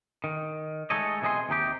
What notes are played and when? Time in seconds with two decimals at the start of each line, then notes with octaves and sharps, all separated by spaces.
0.24 D#3
0.90 G#3 A3 D#4 A4 C#5 D#5
1.22 B1 C3 E3 D#5 G#5 C6
1.49 D#2 C3 D#4 G4